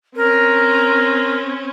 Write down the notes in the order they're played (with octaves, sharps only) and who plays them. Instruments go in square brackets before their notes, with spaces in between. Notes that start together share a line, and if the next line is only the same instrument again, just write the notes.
[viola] C4 C#4 [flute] A#4